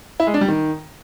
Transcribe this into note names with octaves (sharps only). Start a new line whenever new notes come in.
E4
G#3
D4
G3
D#3